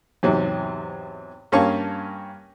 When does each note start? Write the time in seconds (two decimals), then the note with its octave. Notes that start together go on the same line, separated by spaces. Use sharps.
0.23 E2 G#2 C3 F#3
1.52 G2 A#3 C#4 F5 A5 C#6